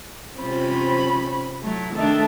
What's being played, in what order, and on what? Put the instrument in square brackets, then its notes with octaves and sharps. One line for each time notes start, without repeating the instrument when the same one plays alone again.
[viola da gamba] C3 F4 C5 [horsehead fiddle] C#4 B5
[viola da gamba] F#3 E4 [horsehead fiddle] A3
[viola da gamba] D#3 A3 D4 [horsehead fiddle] A4 E5